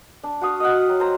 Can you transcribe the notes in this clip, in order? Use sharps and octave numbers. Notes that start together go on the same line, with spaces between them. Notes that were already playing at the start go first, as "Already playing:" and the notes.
D4
F#4 F5 D#6
D#5 F5 F#5
F#3 G5
C5 A#5